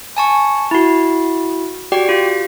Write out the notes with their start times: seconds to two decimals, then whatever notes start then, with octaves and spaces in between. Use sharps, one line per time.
0.17 G#5 A5 C#6
0.71 E4 F#4
1.92 F#4 G4 D5 G5
2.09 F4 G4